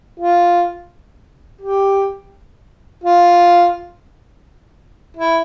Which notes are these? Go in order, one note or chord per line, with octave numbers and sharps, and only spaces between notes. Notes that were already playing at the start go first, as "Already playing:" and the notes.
F4
G4
F4
E4